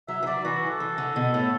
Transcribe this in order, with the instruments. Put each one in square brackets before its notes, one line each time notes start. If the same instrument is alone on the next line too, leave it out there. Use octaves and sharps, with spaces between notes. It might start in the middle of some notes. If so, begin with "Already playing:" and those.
[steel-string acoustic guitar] F#3 [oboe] E5
[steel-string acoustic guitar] E3
[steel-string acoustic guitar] F#3 [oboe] D5
[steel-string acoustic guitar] E3 [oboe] F#4
[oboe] A4
[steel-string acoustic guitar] E3
D3
B2
A2